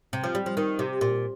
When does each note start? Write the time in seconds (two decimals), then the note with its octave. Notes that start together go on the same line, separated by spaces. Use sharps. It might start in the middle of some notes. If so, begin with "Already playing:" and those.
0.13 C3
0.24 F3
0.35 G3
0.46 F3
0.57 D#3
0.79 C3
1.01 A#2